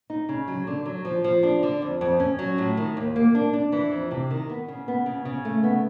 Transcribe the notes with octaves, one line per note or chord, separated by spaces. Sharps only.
D#4
C#3
F#3
D3
F#3
F3
F3
D4
D3
F2
F2
C#4
F#3
A2
D#3
D#2
A#3
D4
D4
E3
F2
C3
D#3
B3
C#3
B3
C#3
C#3
A3
B3